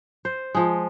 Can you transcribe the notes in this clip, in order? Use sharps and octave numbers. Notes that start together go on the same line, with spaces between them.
C5
F3 G#3